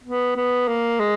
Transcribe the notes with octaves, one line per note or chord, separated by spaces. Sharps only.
B3
B3
A#3
G#3